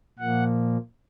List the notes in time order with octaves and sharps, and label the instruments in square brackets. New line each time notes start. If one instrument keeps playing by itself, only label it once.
[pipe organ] A#2 F3 A#3 F#5